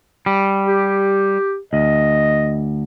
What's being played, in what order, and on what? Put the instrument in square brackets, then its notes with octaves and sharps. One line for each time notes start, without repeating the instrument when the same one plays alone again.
[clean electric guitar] G3
[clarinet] G4
[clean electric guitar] D2 [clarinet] D#5